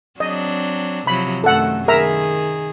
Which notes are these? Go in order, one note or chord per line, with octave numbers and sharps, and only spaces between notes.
F#3 C4 D4 D#5
C3 F3 F#3 B5
F#2 D#3 A3 A4 F#5
D#3 G#4 A#4 E5 A#5